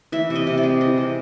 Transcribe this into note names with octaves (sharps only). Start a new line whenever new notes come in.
E3 E5
C3
D#5
C3
D5
G#3
E3 D#5
C3